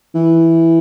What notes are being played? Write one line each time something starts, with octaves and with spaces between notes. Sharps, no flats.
E3